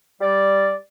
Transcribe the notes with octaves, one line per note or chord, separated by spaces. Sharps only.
G3 D5